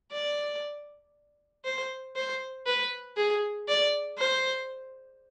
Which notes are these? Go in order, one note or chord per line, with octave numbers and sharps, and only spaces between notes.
D5
C5
C5
B4
G#4
D5
C5